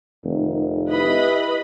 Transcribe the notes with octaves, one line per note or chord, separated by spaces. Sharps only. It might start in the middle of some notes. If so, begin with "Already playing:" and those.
F1 D#3
E4 G4 B4 D#5 B5